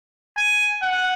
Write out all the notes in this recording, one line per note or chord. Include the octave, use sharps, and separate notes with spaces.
G#5
F#5